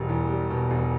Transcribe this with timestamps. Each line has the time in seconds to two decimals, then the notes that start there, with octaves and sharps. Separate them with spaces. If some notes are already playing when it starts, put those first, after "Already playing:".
Already playing: E1 B2 G3
0.09 E2
0.30 G3
0.50 B2
0.71 E1